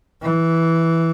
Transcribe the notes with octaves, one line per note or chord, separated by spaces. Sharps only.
E3